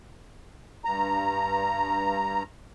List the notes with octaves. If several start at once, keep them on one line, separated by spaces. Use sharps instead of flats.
G2 A#5